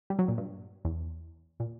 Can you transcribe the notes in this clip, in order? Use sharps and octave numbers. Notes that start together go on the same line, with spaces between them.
G3
F#3
A#2
G2
E2
A#2